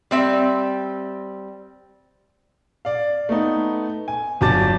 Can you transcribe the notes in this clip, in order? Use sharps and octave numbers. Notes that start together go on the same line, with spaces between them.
G3 C4 E5
D5 F5
A3 B3 D#4
G#5
G1 F#3 A5 D6 A6